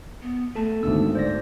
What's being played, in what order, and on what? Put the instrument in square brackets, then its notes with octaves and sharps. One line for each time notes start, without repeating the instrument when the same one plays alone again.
[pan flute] B3
[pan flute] A3 [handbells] A4 A5
[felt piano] G#1 D2 [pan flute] B3 [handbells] E6
[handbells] C5 D5 A#6